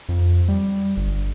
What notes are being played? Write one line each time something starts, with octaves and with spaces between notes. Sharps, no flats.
F2
G3
G1